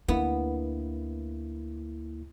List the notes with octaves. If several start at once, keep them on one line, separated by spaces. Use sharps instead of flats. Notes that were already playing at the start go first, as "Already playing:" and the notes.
D2 A#3 B3 D4 E4